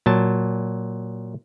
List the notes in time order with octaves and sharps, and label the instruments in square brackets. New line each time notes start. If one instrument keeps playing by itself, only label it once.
[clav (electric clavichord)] A#2 F#3 A5